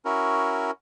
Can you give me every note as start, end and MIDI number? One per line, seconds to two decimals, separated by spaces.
0.05 0.71 61
0.05 0.71 64
0.05 0.71 66
0.05 0.71 70